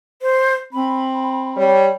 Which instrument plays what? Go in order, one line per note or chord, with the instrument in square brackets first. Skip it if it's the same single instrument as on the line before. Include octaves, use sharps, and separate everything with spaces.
[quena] C5
[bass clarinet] C4 [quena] B5
[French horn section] G3 C#5